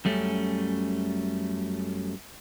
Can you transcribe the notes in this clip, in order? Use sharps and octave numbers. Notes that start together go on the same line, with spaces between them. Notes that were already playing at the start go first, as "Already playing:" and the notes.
F#2 G3 A3 C#4